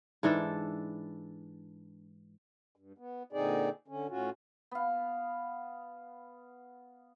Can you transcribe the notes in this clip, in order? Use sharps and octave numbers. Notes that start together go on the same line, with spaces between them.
G#2 E3 D4 A4
G2
B3
A#2 D3 C4 D#4 G#4 D5
D3 C#4
A2 C#4 F4 F#4
B3 F5